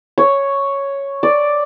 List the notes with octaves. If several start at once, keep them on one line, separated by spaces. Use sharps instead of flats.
C#5
D5